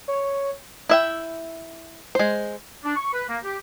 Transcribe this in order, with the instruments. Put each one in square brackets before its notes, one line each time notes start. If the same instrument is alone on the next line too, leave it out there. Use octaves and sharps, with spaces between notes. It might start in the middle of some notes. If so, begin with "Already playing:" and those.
[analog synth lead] C#5
[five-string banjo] E4 E5 G5
G#3 C5
[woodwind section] D4
C#6
B4
A#3
G4